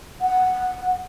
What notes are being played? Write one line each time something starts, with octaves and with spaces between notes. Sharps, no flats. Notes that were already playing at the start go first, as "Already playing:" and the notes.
F#5